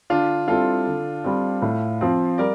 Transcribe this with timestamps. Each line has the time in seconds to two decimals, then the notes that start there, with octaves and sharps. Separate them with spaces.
0.10 D3 D4 F4
0.48 G3 C4 E4 F4 A4
0.87 D3
1.24 G3 C4
1.62 A2
2.01 F3 C4
2.38 G3 A#4 D5